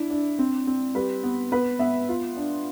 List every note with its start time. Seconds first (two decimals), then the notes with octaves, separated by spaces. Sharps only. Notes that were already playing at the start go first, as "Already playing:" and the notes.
Already playing: D4 E4
0.10 D4
0.39 C4
0.67 C4
0.95 G3 B4
1.23 B3
1.52 B3 B4
1.79 B3 E5
2.09 F4
2.37 D4